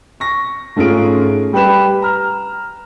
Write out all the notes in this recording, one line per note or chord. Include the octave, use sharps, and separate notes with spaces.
C#6 A#6
G#2 A3 C#4 F4 G#4 D7
G3 G4 B4 B5 E7
A#5 F6